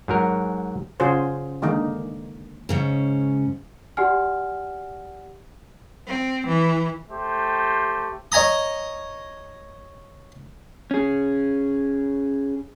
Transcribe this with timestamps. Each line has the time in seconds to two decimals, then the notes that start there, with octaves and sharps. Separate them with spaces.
0.08 G#2 F#3 A#4
1.00 C#3 C#4 F4 F#4 G#4 C5
1.62 D3 D#3 G#3 A#3 D#4
2.69 G#2 C#3 C#4
3.97 F#4 G4 D5 F#5 G#5 F6
6.07 C4
6.48 E3
7.10 A3 G4 C5
8.32 C#5 D#5 G#5 A#5 D#6
10.91 C#4 G#4